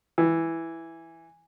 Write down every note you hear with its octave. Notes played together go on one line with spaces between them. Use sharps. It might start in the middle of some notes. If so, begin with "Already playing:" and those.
E3